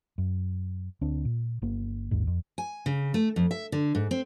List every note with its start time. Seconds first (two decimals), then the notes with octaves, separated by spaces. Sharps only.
0.18 F#2
1.01 D2 C4 D4
1.25 A#2
1.62 G1 A#3
2.11 A1 D#2 G#2
2.27 F2
2.58 G#5
2.86 C#3
3.14 A3
3.36 F2
3.51 E5
3.72 D3
3.95 G#2
4.11 C4